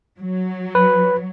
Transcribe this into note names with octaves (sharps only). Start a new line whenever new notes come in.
F#3
B4